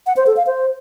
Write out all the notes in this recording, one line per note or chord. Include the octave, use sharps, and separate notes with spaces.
F#5
C5
A4
F5
C5